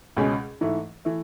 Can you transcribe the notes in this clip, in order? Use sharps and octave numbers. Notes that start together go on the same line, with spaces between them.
C#2 B2 G#3 C#4 G#4
G#2 E3 A3 E4
E3 A3